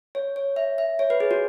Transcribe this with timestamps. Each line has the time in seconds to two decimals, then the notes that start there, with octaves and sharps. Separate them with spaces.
0.15 C#5
0.36 C#5
0.56 E5
0.78 E5
0.99 C#5
1.10 B4
1.20 G#4
1.31 F#4